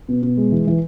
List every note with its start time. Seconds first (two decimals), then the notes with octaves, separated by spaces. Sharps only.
0.09 B2
0.22 B2
0.37 G#3
0.52 E3
0.67 E3